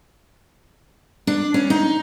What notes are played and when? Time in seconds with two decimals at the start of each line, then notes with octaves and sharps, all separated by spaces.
1.27 D4
1.54 C#4
1.70 D#4